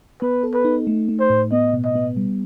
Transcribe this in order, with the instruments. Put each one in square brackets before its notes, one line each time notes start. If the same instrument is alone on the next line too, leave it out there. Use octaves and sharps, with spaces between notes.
[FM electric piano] B3 [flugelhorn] B4
[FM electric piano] A4
[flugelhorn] B4
[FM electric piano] D#4
A3
A3
[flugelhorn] C5
[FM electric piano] A2
[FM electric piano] B3 [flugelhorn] D#5
[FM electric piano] B2
[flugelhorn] D#5
[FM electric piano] B3
G3